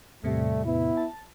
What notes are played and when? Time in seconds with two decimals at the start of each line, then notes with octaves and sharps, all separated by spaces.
0.24 E2 A2 C3 G3 A3
0.65 B3 E4
0.97 A5